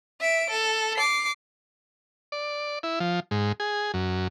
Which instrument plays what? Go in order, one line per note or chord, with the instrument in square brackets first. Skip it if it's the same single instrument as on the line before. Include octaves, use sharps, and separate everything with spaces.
[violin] E5 D7
A4
D6 C7
[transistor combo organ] D5
E4
F3
G#2
G#4
F#2